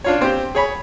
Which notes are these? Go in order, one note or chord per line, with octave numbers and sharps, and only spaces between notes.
D4 F4 C#5
C4 G4
G#4 C#5 B5